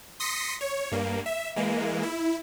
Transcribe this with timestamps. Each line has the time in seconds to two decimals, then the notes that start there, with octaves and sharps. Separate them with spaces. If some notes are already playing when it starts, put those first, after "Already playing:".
0.20 C6 D#6 A#6 B6 C#7
0.61 C#5
0.92 G2 A#3
1.26 E5
1.56 E3 G#3 A#3
2.03 E4